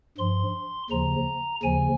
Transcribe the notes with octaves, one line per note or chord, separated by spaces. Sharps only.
G2 F3 C6
D#2 C#3 F3 A#5
D#2 C#3 F3 G#5